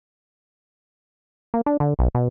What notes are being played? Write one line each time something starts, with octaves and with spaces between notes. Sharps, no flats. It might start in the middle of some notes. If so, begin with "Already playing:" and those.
A#3
D4
D3
B1
B2